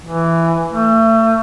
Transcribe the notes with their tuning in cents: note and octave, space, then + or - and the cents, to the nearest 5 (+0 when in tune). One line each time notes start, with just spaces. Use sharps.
E3 +10
A3 +35